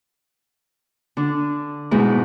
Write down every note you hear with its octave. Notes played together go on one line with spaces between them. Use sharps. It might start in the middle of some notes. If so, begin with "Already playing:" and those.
D3 D4
G#2 B2 G#3 E4